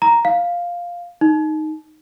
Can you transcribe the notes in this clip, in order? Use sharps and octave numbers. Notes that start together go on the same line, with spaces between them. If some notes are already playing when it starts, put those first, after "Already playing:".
A#5
F5
D#4